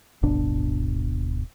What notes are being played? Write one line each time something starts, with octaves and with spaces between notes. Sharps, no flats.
D1 G1 B2 D4